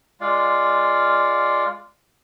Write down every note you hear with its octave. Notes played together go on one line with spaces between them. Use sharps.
G#3 F4 D5 F5